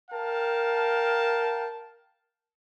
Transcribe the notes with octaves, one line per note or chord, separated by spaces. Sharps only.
A#4 F5 G5 A5